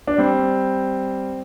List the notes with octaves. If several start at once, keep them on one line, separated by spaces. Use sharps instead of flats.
D4
G3 C4